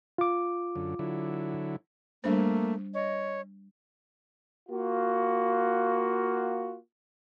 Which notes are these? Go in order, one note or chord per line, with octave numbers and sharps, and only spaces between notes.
F4 D6
F#2 D3
D3 F#3 E4
G3 A3 A#3 D4 C5
C#5 D#5
A#3 F4 F#4